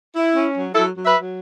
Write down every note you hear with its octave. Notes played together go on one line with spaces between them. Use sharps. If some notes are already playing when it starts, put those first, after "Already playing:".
E4
C#4
F#3
F#3 E4 A4
F#3
B4 E5
F#3